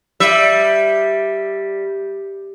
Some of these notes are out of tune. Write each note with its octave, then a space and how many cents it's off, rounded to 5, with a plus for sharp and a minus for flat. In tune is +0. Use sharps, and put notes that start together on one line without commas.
G3 +0 E5 +0